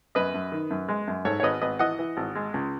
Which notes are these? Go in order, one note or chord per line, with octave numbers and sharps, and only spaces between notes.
F#2 B4 D#5
F#2
D#3
F#2
G#3
F#2
G#2 A4 C#5
C#5
G#1 B4 D#5
G#1 B4 D#5
E3 D#5 F#5
E3
G#1
G#3
C#2